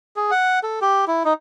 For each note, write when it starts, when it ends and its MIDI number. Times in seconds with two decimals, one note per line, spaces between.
0.16 0.31 68
0.31 0.59 78
0.63 0.79 69
0.81 1.05 67
1.07 1.23 64
1.25 1.33 63